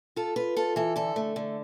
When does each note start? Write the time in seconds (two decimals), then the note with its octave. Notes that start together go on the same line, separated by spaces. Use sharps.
0.16 F4 A4
0.36 F4 B4
0.57 F4 A4
0.76 E3 A4
0.96 D3 A4
1.16 A3
1.36 D3